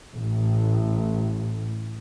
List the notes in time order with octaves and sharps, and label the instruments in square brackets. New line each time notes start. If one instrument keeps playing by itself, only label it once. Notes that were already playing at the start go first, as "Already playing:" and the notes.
[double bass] A1 A2